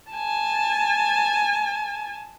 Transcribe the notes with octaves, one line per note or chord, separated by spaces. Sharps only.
G#5 A5